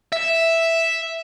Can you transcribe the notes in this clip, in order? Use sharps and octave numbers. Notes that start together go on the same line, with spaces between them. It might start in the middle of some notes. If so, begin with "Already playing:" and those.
E5